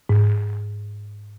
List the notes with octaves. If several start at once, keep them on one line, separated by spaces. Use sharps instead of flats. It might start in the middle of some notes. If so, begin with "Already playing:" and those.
G#2